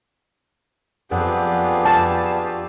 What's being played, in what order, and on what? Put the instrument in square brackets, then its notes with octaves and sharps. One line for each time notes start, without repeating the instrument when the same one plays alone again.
[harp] F2 B4 F#5 [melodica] B3 D4 G#4 [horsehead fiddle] F4 G4
[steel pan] A5 [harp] C#6 E6 F6